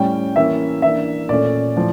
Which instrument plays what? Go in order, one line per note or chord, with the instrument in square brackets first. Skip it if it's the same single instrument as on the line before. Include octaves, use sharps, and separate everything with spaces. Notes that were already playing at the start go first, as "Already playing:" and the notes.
Already playing: [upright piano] A2 G3 C#4 G5
E3 A#3 C#4 E5
E3 A#3 D4 E5
A#2 A3 C#4 D5
A2 F3